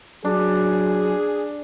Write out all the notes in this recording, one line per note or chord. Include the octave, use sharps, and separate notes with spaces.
F#3 D4 G#4